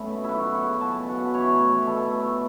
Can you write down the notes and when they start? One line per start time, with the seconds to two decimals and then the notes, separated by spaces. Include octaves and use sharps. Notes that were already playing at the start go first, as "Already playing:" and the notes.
Already playing: A3 B3 C#4 E5
0.10 B2
0.24 E4
0.29 F#3 F#4
0.46 B3
0.55 F#5
0.64 C#3
0.81 F#3 A5
1.00 B2
1.08 F#5
1.17 B3
1.34 E3 C#5
1.52 A2
1.70 E3
1.87 B2 A4
2.05 A3
2.23 B2